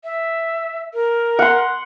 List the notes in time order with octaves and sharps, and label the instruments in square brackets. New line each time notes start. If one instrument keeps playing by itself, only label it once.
[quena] E5
A#4
[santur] F#5 C6